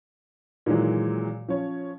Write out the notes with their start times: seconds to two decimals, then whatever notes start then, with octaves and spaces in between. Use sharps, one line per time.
0.66 A#2 D#3 E3 F#3 G#3
1.48 F3 C#4 C#5